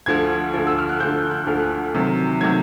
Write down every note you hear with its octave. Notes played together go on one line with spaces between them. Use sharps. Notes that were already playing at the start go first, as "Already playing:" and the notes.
D2 D3 F3 G#6
D2 D3 F3
E6
F6
F#6
D2 D3 F3 G6
F#6
F#6
D2 D3 F3 F6
C3 D#3 F#3
C3 D#3 F#3 G#6